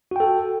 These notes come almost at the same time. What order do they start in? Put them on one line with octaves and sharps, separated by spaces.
F#4 G5 A4